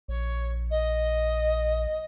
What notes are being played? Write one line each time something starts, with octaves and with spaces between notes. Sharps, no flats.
A#1 C#5
D#5